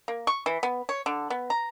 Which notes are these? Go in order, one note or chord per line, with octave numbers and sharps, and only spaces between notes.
A#3
C#6
E3
B3
C#5
D3
B3
A#5